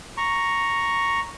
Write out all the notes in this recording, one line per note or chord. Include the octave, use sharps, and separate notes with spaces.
A#5 C#6